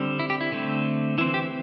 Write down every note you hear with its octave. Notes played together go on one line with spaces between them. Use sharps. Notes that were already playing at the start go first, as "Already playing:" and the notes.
Already playing: D3 G3 C4
E4
G4
E4
D3 A3 C4
E3 C4 E4
G4